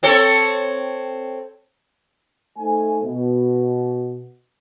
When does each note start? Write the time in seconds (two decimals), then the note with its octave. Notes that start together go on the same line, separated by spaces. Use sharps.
0.03 C4 A4 C#5
2.58 A3 D#4 A4 C5 G#5
3.04 B2